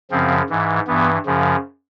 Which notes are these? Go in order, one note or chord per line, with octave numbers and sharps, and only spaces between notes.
F#2 C#3 F3 C4
G#2 E3
G2 E3 B3
F#2 C#3 F3